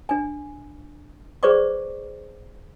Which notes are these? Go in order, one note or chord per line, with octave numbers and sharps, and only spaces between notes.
D4 G#5
G#4 B4 C5 D5 C#6 D6